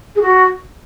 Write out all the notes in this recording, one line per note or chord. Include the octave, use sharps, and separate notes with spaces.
G#4
F#4